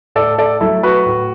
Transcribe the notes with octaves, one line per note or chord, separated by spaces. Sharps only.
A2 A4 D5
A4 D5
F#3 A3 E4 A4
F#4 B4
A2